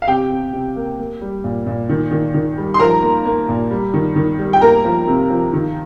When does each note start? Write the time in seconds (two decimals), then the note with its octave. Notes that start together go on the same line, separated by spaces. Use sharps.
0.02 F5
0.07 C3 G4 G5
0.30 C3
0.53 C3
0.76 A#3
0.99 A#3
1.21 G3
1.44 A#2
1.67 A#2
1.89 D#3
2.11 D#3
2.34 D#3
2.57 G3
2.74 C6
2.79 F3 A#4 A#5
3.02 A#3
3.25 A#3
3.49 A#2
3.71 G3
3.94 D#3
4.16 D#3
4.39 G3
4.53 G5
4.61 A#3 A#4 A#5
4.84 F3
5.07 C3
5.30 F3
5.53 D#3